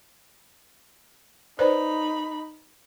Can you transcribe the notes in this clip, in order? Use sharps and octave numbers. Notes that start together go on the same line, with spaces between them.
D#4 B4 C5 D5 B5